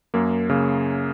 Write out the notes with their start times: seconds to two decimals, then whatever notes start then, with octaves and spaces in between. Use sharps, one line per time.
0.14 F#2 A#3
0.50 C#3 A#3